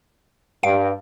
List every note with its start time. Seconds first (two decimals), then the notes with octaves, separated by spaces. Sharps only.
0.63 G2 F5 D7